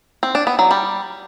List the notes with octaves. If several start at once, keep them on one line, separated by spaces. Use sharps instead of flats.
C4
D4
B3
F#3
G3